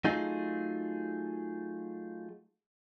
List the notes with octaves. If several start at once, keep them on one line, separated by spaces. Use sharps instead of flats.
F#3 A3 D#4 F4 G#4